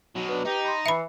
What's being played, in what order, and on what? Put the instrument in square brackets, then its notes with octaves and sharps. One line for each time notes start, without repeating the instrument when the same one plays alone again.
[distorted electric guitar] B2 F#3
[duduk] D4 [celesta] B4
[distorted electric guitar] D#4 [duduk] G4
[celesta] B5 C6
[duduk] E3 [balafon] E5 B5 [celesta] C7 C#7